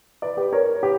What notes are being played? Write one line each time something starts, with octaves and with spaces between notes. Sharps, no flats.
B4 D5
G4 B4
A#4 C#5
G4 B4